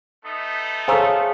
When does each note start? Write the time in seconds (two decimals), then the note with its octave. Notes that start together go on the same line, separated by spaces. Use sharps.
0.24 A3 B3 D#4
0.88 G#4 A4 C5 C#5 F5 G#5 A#5 E6